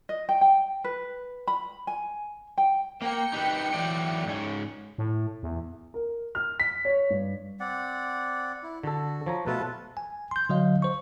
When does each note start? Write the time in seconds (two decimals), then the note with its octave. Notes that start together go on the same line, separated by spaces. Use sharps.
0.09 D#5
0.29 G5
0.41 G5
0.84 B4
1.48 B5
1.87 G#5
2.58 G5
3.02 A#3 G5 C#7
3.33 D#4 G4 B4
3.74 E3 F#3 D5
4.26 G#2 C#4
4.98 A2
5.43 E2
5.94 A#4
6.35 F6
6.60 B6
6.85 C#5
7.10 G2
7.60 C4 D5 F#5
8.63 E4
8.83 D3 F#4 A4
9.26 F3 C#5 A#5
9.47 B2 A3 F4 A4 B4
9.97 G#5
10.31 C6 G6
10.49 D3 F#3 D#5 F5
10.82 C5 C#6